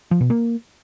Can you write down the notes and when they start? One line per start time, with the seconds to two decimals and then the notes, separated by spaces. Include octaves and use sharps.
0.11 F3
0.21 B2
0.30 A#3